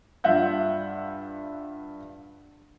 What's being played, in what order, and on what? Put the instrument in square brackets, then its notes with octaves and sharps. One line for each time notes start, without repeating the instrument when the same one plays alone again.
[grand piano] G2 F4 E5 F#5 G6